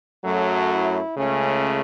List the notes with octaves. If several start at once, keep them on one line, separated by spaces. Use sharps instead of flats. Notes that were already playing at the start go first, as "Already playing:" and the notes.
F#2 F#3 A3 A4
E4
C#2 C#3 A3 C#4